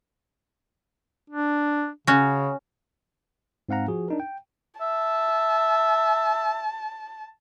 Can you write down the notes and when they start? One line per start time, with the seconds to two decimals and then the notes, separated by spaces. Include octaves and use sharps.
1.30 D4
2.07 C#3 C#4 F#4
3.69 G#2 C4 F5 F#5 A#5
3.88 F3 F#4 G#4
4.08 D4 D#4 A#4
4.20 G5
4.81 E5 A5